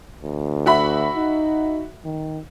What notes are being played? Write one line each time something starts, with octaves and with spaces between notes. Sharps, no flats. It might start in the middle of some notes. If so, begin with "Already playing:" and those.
D2
F#4 E5 B5
D#4
D#3